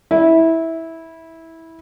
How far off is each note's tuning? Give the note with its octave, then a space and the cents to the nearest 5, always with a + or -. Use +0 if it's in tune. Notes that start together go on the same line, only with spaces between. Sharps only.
E4 -15